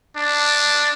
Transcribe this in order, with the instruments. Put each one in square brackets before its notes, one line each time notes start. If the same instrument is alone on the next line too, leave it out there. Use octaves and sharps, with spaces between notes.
[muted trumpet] D4